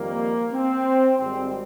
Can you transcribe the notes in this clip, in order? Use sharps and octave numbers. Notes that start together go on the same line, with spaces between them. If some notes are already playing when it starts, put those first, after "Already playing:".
Already playing: F2 D#3 G3 A#3
C4
G#1 G#2 G3 C4